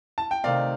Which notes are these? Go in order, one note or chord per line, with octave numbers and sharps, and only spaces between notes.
A5
G5
C3 D#3 A3 C4 D5 F5